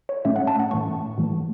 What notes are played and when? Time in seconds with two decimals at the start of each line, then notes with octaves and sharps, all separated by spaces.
0.09 C#5
0.25 A2 A3 C#4 E5
0.36 F#5
0.47 A5
0.60 F#5
0.71 A2 E3 A3 C#6
1.18 A2 E3 A3